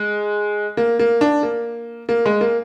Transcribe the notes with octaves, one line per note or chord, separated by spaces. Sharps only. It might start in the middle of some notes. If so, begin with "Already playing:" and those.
Already playing: G#3
A#3
A#3
D4
A#3
A#3
G#3
A#3